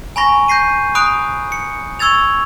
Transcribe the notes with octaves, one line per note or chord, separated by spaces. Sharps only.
G#5 A#5 B5 C#6 A#6
G6 A#6 C7 D#7
B5 D#6 F#6 D7
C#7
C#6 E6 G#6 A6 F7